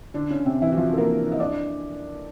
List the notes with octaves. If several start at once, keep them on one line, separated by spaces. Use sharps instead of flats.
D3 D4
C#3 C#4
C3 C4
E3 E4
F#4
F3 F4
A4
A#3 A#4
D#5
D4 D5